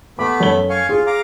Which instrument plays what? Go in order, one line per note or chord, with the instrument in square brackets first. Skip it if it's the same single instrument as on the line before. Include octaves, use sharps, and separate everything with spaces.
[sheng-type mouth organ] A3 B3 B5 [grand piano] D6
[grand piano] F#2 A4 G7
[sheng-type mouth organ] F5 G#5 C#6
[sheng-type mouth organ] F4 [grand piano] G#4
[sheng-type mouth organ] F5 A#5 D6